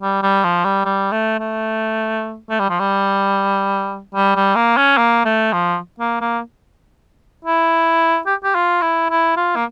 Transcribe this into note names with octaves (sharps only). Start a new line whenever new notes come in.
G3
G3
F3
G3
G3
A3
A3
A3
G3
F3
G3
G3
G3
A#3
C#4
A#3
A3
F3
A#3
A#3
E4
G4
G4
F4
E4
E4
F4
A#3